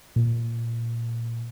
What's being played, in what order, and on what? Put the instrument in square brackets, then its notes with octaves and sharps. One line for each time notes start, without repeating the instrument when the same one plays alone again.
[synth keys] A#2